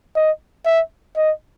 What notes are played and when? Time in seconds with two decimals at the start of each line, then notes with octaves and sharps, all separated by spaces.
0.16 D#5
0.66 E5
1.16 D#5